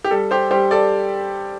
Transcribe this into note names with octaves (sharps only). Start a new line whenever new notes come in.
G4
G3 A4
G4 C5
G3 G4 C5
A4 D5